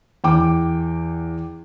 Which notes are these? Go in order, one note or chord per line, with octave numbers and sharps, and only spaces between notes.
E2 G5 D6